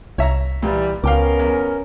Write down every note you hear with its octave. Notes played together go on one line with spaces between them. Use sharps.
C2 C#5 E5 A#5
A#2 E3 G3
C#2 B3 C#4 A#4 F5 G5 D6
E2